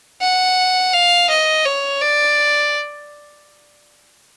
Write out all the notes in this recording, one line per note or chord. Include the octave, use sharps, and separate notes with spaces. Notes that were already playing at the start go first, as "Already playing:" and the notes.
F#5
F5
D#5
C#5
D5